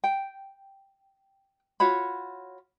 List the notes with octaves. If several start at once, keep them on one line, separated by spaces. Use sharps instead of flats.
G5
F4 F#4 C#5 B5